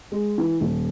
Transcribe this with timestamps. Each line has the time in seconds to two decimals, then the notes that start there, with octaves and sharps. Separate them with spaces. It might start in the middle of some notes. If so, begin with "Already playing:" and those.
0.12 G#3
0.38 E3
0.61 D#1